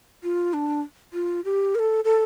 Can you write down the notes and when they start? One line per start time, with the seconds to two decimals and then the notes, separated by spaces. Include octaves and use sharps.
0.23 F4
0.53 D4
1.13 F4
1.45 G4
1.75 A#4
1.79 A4
2.05 A4